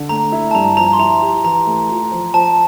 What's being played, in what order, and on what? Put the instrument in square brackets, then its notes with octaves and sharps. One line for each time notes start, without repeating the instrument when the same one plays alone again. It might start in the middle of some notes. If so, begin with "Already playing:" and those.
Already playing: [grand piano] D3
[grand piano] A3 [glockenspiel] A#5
[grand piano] E4
[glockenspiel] A5
[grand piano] G2 [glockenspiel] A#5
[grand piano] F3 [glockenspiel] A#5
[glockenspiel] C6
[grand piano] E4 [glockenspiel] A#5
[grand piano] G4
[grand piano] E3 [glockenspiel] A#5
[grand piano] A3
F4
F3
[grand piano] F3 [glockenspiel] A5